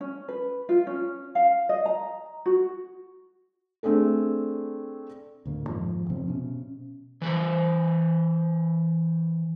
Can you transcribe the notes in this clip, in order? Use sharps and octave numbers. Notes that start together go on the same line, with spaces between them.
C#4
B4
F4
C#4
F5
D#5
A#5
F#4
A3 C4 D4 G#4 A4
D2 A2 A#3
F2 G#2 D#3 F3
C3 F3 C4
B2 C#4
E3 B4 C5